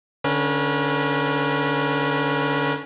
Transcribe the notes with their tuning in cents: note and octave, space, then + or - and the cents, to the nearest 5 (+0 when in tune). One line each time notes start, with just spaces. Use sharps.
D3 +0 C#4 +0 B4 -40